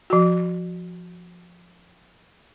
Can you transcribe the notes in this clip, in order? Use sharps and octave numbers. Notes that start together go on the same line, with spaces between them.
F3 F#4